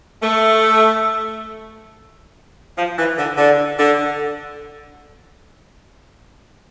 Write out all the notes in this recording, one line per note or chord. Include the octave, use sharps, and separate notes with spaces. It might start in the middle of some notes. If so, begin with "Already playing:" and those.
A3
F3
E3
D3
D3
D3